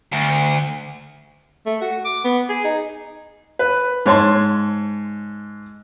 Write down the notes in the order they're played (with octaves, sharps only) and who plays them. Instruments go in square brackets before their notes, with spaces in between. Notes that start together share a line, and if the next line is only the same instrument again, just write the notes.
[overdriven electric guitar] D2
[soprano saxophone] A3
F#4
D6
B3
G#4
D#4
[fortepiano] B4
G#2 C#5 A5 C6